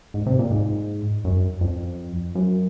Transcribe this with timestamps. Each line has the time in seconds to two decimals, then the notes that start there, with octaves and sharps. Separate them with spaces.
0.14 G#2
0.26 C3
0.39 A#2
0.51 G#2
1.25 F#2
1.61 F2
2.35 F#2